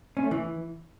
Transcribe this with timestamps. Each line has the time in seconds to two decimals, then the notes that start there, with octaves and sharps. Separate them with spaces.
0.17 C#4
0.24 A3
0.31 E3